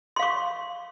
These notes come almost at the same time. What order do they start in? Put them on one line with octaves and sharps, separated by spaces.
C6 F5 C#6